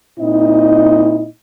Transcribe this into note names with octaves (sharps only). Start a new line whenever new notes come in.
A#2 C4 D#4 E4 D#5